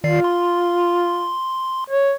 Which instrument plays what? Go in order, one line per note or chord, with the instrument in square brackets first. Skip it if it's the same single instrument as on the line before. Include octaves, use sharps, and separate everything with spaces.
[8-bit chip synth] D#3 D5 C7 [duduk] F4
[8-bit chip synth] C6
[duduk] C#5